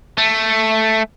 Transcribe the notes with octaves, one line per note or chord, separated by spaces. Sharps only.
A3